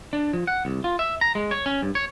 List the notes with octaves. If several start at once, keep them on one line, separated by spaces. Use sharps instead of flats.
D4
F3
F#5
C2
F4
E5
A#5
G#3
C#5
C#4
G2
C#5